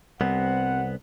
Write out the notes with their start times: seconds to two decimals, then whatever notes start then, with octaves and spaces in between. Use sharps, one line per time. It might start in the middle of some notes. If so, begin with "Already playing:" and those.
0.21 C2 G3 B3 C4 F#5